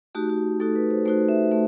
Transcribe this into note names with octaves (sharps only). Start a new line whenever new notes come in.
A3 D#4 F#4 G4
F#4
A3 D#4 F#4 A4
B4
C5
A3 D#4 F#4 C5
E5
A3